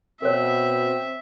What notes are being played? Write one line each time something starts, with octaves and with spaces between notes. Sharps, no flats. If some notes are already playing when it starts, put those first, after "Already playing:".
B2 C4 A#4 C#5 E5